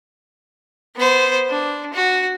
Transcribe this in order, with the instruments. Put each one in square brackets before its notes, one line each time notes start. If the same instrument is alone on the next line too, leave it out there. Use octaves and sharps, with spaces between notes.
[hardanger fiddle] B3 C5
D4
F#4